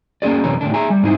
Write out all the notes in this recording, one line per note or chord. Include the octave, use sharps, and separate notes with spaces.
A#3 C#4 D#4 G#4 D5
F#2 C3 E3 A4 C#5 A#5
A2 D3 D4
G#4 E5 G#5 A#5
G3
G#2 C4 D#4 E4 G4 G#4